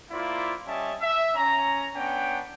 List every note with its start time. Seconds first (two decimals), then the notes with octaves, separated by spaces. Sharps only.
0.11 A#3 E4 F4 C5 D5
0.66 G3 C#4 D#5 E5 A5
1.00 E5
1.34 C#4 A#5
1.95 B3 C#4 D4 G5